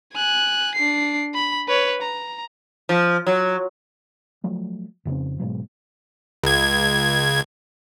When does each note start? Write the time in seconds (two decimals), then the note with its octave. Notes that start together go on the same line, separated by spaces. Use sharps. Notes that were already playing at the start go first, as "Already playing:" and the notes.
0.13 G#5 F#6
0.75 D4 C7
1.34 B5
1.68 B4 C#5
2.02 A#5
2.89 F3
3.27 F#3
4.44 F3 F#3 A3
5.05 F2 C#3 A#3 C4
5.40 G#2 B2 F#3
6.43 C#2 G#6